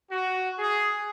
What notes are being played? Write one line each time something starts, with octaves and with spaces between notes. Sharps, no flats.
F#4
G#4